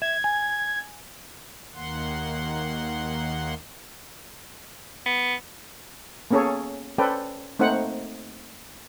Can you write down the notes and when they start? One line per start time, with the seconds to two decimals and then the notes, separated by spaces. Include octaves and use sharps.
0.02 E5 G#6
0.24 G#5
1.74 D#2 D#3 A#3 F#5 C6
5.06 B3
6.31 A#3 B3 C#4 G#4 A4 C#5
6.98 C#4 A4 B4 C5 D5 G5
7.59 A3 A#3 C4 D#4 C5 F#5